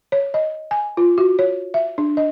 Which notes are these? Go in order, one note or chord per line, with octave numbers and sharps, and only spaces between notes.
C#5
D#5
G#5
F4
F#4
C#5
E5
D4
D#5